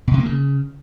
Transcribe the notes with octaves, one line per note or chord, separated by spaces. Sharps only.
B2
C3
A#3
C#3